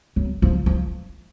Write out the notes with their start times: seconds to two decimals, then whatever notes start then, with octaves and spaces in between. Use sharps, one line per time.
0.16 F#3
0.42 F3
0.66 F3